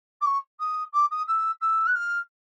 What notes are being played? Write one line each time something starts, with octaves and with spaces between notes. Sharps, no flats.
D6
C#6
D#6
D6
D#6
E6
E6
F#6
F6